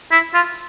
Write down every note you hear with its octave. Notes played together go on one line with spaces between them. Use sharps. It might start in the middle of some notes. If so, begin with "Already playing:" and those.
E4
F4